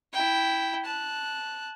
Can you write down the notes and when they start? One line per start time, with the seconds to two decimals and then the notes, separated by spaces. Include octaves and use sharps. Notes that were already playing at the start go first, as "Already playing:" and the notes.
0.13 E4 G5
0.85 A5 F#6